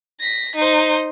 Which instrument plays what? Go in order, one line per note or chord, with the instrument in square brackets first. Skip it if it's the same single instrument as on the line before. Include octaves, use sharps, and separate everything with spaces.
[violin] A#6 B6
D#4 C5